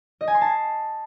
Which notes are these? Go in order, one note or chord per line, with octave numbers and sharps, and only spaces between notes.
D#5
G#5
C6
A5